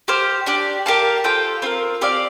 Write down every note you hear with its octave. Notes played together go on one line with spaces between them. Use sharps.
G4 C5 F5
D4 G4 D5
G4 A#4 F5 A5
F4 A4 C5 G5
C4 F4 A#4
C4 G4 D5 F5